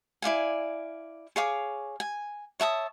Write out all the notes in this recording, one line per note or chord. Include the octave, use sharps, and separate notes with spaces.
E4 D5 F5 G#5
G#4 C#5 F5 D6
G#5
C#5 E5 A5 D#6